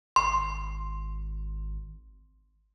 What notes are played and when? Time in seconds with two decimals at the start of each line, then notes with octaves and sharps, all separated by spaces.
0.16 G#1 C6